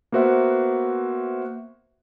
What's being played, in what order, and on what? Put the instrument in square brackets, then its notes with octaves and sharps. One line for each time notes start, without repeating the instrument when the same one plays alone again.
[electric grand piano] A#3 B3 F#4 C5 E5 F#5